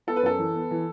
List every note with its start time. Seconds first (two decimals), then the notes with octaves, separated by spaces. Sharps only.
0.07 B3 A4
0.16 B4
0.23 F#2 A4
0.38 E3
0.54 B3
0.71 E3